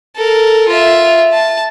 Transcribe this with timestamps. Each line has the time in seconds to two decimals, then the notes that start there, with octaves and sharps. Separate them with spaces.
0.16 A4 A#4
0.69 F4 E5
1.33 A5